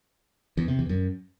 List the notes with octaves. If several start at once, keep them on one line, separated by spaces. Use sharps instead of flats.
E2
C3
E2
F#2